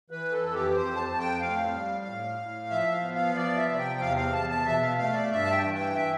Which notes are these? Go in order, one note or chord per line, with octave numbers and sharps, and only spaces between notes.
E3 B4
A4
F2
G4
F2 C5
A5
F2
G5
A2 F5
G3
A2
A2
F3 E5
F5
B3
F5
F3 D5
E5
C3
G5
E2 F5
F5
E2 A5
A5
B2 E5
F5
A3 F5
D5
G2 E5
A5
G5
E3
G5
E5